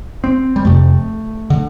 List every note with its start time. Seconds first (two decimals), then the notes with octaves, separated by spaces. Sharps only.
0.24 C4
0.56 G3
0.65 F2 C3 A3
1.50 D3